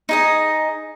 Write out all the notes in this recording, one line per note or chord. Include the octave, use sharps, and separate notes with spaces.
D#4 G#4 D#5